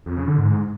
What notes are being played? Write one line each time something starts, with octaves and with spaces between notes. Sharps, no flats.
F2
C#3
D3
G#2